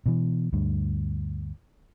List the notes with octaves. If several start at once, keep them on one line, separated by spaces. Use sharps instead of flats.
B2 E3
D2 G2